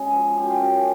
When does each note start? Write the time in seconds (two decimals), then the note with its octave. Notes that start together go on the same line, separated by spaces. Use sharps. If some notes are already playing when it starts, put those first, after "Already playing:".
Already playing: C#3 G#3
0.11 F3
0.37 F#2 G5
0.43 G#5
0.50 F5 G5
0.61 C#3